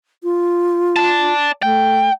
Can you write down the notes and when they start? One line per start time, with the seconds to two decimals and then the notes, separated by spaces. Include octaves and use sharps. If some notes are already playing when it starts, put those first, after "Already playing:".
0.23 F4
0.96 D5 A5
1.63 A3 G5